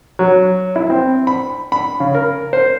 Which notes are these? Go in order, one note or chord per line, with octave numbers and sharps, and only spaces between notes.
F#3
E4
C4
B5
B5
C#3
A#4
C5